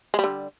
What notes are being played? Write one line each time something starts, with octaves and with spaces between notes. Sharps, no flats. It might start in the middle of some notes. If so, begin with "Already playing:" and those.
D3 G3 G#3